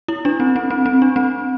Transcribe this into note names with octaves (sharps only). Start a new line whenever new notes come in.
E4
D4
C4
C4
C4
C4
D4
C4